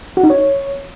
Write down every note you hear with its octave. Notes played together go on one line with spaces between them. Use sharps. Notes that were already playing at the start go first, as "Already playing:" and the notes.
F#4
D#4
C#5